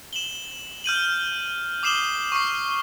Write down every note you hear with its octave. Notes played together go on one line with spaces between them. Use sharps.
E7 F#7 G7
F6 G6 D#7 F#7
D6 D#6 C7 E7 F#7 G7
C#6 F6 C7